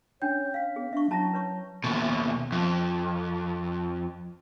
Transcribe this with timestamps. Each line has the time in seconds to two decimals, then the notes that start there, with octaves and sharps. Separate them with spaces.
0.22 C#4 D4 C#5 G5 G6
0.54 F5 B6
0.76 B3 G#4
0.93 D4 E5 C#6
1.11 F#3 C#4 E4 A5 A#5 A#6
1.33 B4 C#5 C#6
1.84 D#2 B2
2.52 F2